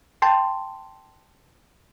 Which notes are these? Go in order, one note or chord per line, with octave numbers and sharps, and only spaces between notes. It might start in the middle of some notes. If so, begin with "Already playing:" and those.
G5 A5 C6